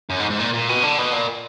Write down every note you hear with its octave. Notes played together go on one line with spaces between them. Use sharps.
F#2
G#2
G#2
A#2
A#2
B2
D3
B2
A#2